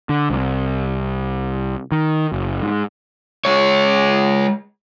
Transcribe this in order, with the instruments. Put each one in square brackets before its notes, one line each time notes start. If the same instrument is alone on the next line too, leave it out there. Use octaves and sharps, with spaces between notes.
[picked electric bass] D3
C2
D#3
F#1
G#2
[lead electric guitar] G#3 C#5